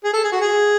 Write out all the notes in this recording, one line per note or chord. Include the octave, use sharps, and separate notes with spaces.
G#4
A4
G#4
F#4
G#4